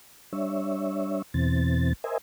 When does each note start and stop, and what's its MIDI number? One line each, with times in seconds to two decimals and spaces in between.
0.33 1.22 55
0.33 1.22 62
0.33 1.22 73
0.33 1.22 76
1.34 1.93 40
1.34 1.93 47
1.34 1.93 52
1.34 1.93 60
1.34 1.93 93
2.04 2.18 70
2.04 2.18 72
2.04 2.18 75
2.04 2.18 76
2.04 2.18 80